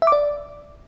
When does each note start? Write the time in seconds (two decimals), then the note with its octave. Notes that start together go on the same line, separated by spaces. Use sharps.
0.02 E5
0.07 D6
0.12 D5